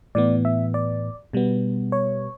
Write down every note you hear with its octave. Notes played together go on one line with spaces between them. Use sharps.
A2 E3 B3 D5
E5
D5
B2 G3 B3
C#5